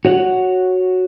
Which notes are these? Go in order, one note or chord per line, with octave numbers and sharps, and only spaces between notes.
F#4 C#5 F#5